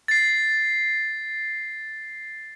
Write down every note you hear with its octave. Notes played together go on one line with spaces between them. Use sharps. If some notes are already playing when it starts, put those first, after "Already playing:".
A6 C7